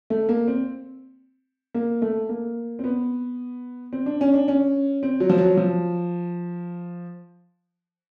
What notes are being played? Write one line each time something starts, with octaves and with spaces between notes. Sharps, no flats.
A3
A#3
C4
A#3
A3
A#3
C4
B3
C4
D4
C#4
D4
C#4
C4
F#3
F3
F#3
F3